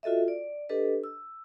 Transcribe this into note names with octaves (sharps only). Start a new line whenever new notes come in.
F4 F#4 A4 D#5 E5
D5
D4 G4 A4 B4 D#5
E6